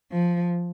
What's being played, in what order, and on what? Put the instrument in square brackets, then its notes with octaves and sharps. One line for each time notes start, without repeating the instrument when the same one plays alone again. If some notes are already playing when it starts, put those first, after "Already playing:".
[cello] F3